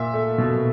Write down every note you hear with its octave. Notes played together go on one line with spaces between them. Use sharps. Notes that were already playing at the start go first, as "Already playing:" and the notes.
Already playing: A#2 E5
A3
B2